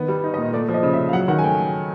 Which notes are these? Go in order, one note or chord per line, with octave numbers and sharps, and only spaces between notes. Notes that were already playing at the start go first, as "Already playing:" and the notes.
Already playing: D#3 B3
G3
D#4
D#5
A#2
A3 D5
F3
D#5
C#3
E5
C#3
F5
F#3 F#5
D#3 F#5
G#5
A3 G5